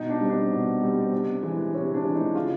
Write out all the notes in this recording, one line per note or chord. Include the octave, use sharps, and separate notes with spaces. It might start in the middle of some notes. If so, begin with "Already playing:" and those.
Already playing: B2 D#4
D4
G3 C4
D4
B2
G3 C4
C3
E3 G#3
C3 C#4
D4
E3 G#3
D#4
C#3 F4